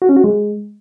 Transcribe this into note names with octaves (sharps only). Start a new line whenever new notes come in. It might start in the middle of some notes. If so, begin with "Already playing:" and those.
F#4
C#4
F#4
G#3